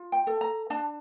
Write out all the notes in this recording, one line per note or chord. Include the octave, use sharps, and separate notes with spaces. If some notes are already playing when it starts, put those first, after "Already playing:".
Already playing: F4
G5
A4
A#5
D4 A5